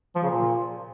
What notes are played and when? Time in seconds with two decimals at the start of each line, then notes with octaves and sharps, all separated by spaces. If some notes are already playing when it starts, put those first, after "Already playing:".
0.16 F3
0.23 C#3
0.30 A#2